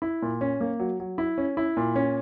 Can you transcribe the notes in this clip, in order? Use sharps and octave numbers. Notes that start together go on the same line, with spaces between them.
E4
A#2
C#4
A#3
F#3
F#3
E4
C#4
E4
A#2
C#4